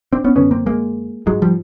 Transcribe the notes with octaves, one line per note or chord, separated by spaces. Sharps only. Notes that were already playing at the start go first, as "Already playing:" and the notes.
C4 D4
B3 C#4
F#2 D3 B3 C#4
A#3 C4
G#3 A#3
G#2 F#3 G#3
F3 G3